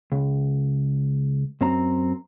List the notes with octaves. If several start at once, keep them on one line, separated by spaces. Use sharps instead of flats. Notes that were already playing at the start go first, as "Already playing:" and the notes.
C#2
F#2 C4 A#5